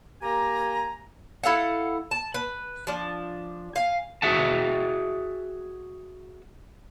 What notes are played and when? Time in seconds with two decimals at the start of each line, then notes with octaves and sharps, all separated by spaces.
0.22 A#3 G4 G#5 A#5
1.44 E4 A4 F5 F#5
2.11 A5
2.34 B4
2.87 F3 D4
3.75 F5 G#5
4.22 F#4 G#4 E5 F#5 A5